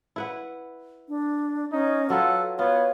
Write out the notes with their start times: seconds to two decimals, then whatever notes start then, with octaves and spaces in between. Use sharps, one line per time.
0.16 E4 B4 F#5
1.09 D4
1.72 C#4 D#4
2.10 F#3 F4 A4 B4 F#5
2.59 B3 F4 C#5